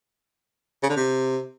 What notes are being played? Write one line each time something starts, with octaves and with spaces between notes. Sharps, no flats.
C#3
D3
C3